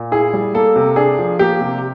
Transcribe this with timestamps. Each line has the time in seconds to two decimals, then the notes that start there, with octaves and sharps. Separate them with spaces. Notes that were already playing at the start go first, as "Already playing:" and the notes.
Already playing: A#2
0.12 E4 G#4
0.33 G3
0.54 A#3 A4
0.76 C3
0.96 D4 G#4
1.19 F3
1.39 A#3 G4
1.61 C3